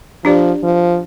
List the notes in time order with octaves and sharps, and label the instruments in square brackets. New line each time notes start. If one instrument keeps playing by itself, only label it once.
[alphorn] F3 [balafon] D4 G4 D5
[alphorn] F3